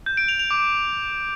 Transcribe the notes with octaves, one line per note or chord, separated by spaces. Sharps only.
G6
D7
F7
F7
D6